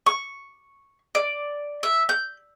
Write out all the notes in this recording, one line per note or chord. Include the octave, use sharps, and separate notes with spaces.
C#6
D5
E5
G6